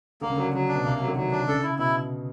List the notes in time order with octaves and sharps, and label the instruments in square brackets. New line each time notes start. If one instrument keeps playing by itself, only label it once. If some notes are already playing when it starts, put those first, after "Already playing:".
[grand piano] D3 [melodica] A#3
[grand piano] C#3
[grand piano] D3 [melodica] F#3
[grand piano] C#3 [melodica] F#3
[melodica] D4
[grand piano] B2
[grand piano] C3 [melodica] A#3
[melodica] F#3
[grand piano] D3
[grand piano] D#3 [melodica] F#3
[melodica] D4
[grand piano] C#3 [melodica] A4
[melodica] E4
[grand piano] B2 [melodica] E4